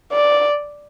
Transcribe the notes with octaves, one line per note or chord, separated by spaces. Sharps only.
D5